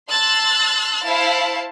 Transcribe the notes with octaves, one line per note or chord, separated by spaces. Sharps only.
A5 C6 E6 F#6 A6
E4 C5 F5 A5